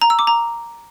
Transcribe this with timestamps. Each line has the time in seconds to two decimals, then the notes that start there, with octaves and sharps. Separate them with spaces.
0.02 A#5
0.10 E6
0.19 D6
0.27 A#5